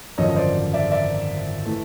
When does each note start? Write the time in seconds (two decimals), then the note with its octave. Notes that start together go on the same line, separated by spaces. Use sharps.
0.18 G#1 F#2 D3 F3 C#5 D#5
0.29 D#5
0.36 C5 D5
0.74 D5 E5
0.91 D5 E5
1.65 E3 A3